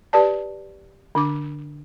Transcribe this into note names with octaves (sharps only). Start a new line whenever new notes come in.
G4 B4 D5 A5
D3 D4 D6